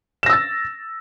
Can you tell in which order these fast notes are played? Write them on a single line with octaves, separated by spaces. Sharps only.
E7 A#6 E6 A6